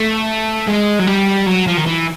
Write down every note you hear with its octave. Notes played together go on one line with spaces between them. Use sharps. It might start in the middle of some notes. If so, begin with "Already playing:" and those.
Already playing: A3
G#3
F#3
G3
F#3
F3
D#3
E3